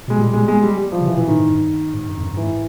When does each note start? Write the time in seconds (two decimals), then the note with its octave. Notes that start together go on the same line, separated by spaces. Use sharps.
0.08 B2 G#3
0.18 A#2 G3
0.33 G#3
0.48 G#3
0.63 G3
0.77 G3
0.92 F3
1.01 C#3
1.06 C3 E3
1.17 B2 E3
1.28 A2 D#3
1.39 G#2
1.49 G2
1.94 G#2
2.09 G2
2.17 F2
2.23 F#2
2.33 G2
2.37 G#2 E3